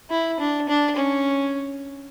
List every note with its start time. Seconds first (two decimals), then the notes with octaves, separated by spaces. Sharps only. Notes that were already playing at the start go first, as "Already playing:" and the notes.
0.11 E4
0.40 D4
0.69 D4
0.96 C#4